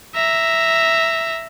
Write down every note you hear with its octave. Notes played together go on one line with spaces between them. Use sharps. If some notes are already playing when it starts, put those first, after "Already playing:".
E5 A#5